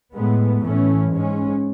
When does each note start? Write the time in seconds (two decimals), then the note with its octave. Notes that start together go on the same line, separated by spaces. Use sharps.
0.13 A2 G#3 B3
0.61 A2 E3 A3 C#4
1.09 G#2 G#3 C#4